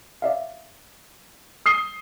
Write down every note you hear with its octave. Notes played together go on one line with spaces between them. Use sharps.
D5 E5 F5
D#6 C7 G7